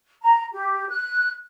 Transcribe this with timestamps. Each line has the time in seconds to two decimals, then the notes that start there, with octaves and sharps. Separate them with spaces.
0.22 A#5
0.53 G4
0.88 F#6